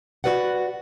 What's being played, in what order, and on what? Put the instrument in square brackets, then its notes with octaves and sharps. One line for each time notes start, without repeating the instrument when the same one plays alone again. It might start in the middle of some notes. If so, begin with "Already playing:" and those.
[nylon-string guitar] F#4 A4 B4 D5 F#5